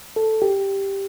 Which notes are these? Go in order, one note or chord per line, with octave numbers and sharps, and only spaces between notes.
A4
G4